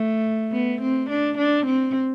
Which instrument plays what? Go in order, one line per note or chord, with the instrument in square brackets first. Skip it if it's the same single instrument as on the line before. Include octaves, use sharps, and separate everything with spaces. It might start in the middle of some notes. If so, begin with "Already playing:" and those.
Already playing: [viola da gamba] A3
B3
C4
D4
D4
C4